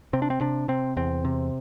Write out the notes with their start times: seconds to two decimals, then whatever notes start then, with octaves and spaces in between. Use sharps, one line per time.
0.13 C3 C4
0.22 D4
0.30 C4
0.41 C3 D4
0.68 C3 C4
0.97 E2 C4
1.25 C3